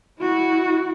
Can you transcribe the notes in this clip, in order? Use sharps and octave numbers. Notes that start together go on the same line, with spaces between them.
E4 F#4